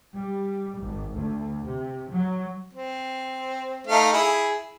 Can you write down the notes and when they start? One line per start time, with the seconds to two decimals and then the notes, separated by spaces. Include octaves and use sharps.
0.14 G3
0.78 G#1
1.14 D2
1.66 C3
2.11 F#3
2.73 C4
3.87 A3 D#4 F5
4.13 E4 G#4